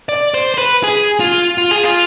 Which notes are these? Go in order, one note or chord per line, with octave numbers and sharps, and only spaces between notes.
D5
C5
C5
B4
G#4
F4
F4
G#4
F4